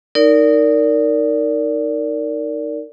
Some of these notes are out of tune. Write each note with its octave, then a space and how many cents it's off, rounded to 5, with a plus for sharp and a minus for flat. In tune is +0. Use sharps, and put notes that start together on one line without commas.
D#4 +0 A#4 -20 D5 -20